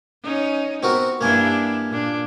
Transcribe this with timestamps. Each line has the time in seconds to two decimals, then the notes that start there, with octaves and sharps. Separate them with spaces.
0.23 C#4 D#4
0.83 B3 C4 F#4 A#4
1.21 G2 A#3 D4 E4 G#5
1.89 A#2 D4